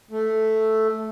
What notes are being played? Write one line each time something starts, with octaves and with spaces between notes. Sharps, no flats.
A3